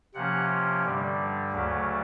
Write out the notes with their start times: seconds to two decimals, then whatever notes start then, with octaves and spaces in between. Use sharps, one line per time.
0.14 C3 F3 A#3 C#4 F#5
0.84 G2 D3 G3
1.52 D2 C#3 F#3 A3